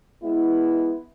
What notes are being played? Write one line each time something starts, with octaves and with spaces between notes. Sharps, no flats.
G#3 B3 E4